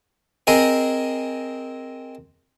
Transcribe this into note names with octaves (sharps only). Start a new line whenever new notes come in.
C4 G#4 A#4 D#5